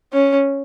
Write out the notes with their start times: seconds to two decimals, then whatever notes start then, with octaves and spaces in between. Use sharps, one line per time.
0.13 C#4